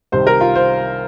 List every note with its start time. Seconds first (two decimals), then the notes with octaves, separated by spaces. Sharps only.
0.12 C2 C3 D#3 C5
0.27 A#4
0.41 F4
0.55 C5